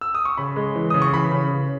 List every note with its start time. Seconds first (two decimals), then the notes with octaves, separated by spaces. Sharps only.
0.01 E6
0.15 D#6
0.25 C#6
0.38 C#3 B5
0.56 G#3
0.75 E3
0.90 C#3 D#6
1.02 C#6
1.13 E3 B5
1.32 C#3
1.50 C#3